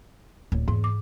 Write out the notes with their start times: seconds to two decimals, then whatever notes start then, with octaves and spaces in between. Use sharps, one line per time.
0.52 D1
0.68 E2 G#2
0.84 D6